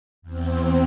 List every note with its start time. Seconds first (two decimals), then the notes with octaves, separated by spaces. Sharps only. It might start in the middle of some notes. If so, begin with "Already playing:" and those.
0.22 E2 C4